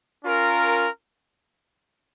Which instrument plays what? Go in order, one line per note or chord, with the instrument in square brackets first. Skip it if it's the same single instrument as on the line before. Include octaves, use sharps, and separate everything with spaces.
[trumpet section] C#4 F4 A#4